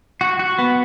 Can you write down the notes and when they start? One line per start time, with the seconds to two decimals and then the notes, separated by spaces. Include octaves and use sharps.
0.21 F#4
0.39 F#4
0.59 B3